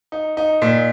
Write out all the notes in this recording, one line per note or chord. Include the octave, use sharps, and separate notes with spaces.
D#4
D#4
A#2